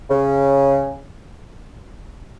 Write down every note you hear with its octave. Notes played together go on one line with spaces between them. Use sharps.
C#3